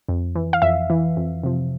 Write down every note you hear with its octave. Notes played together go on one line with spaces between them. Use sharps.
F2
E3
F5
F2 E5
E3
F2
C3 F3